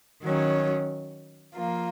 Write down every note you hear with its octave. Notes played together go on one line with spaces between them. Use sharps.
D#3 F#3 C#4
F3 A#3 F4